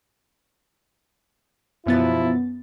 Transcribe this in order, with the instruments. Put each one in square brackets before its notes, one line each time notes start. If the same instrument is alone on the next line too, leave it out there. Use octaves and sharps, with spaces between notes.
[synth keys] F#2 B3 A6 [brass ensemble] B2 F3 E4